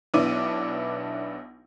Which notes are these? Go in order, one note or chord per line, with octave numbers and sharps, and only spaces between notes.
B1 B3 D4 E4 D6 D#7